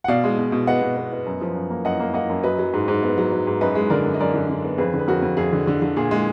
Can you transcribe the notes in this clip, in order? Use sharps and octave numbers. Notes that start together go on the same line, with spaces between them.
F#5
B2 D5 F5
G#3
B2
B2
B3 D#5 F#5
B2
B3
B3
F#2
F3
F#2
A#3
F#2 D#5 F#5
A#3
A#3 D#5 F#5
F#2
F#3 B4 D#5
F#3
G#2
G#2
B3
F#3
F#3
G#2
F#2 B4 D#5
G#3
D3 A#4 D5
F#2
D#5
F#2 A#4 D5
D3
D3
B3
F2 G#4 B4
D3
B4
F2 F#4 A#4
F2
F2 G#4
D3
D3
D3
A#2 G#4
G#3